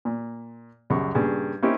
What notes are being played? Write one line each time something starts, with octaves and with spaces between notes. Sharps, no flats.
A#2
C#2 F#2 C#3 G3 C#6
G2 A#2 C#3
A#3 C4 C#4 D#4 E4 G4